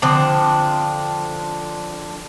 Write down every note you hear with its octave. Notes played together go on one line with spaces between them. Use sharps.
D3 F3 C4 D4